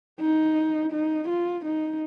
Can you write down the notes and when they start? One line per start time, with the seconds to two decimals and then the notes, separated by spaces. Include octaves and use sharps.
0.21 D#4
0.92 D#4
1.29 F4
1.65 D#4